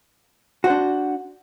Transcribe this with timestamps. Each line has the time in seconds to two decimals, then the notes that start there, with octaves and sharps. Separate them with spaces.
0.64 F#4
0.67 C5
0.70 D4